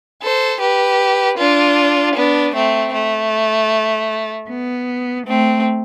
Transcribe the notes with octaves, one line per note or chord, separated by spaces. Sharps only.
A4 C5
G4 B4
D4 F4
B3 D4
A3 C4
A3
B3
A3 C4